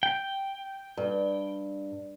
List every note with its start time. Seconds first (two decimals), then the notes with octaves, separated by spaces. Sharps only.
0.03 G5
0.97 G2